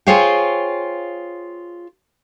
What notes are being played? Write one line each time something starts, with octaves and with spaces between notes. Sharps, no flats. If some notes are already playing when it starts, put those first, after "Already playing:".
F4 G#4 C5 C#5 F5 G5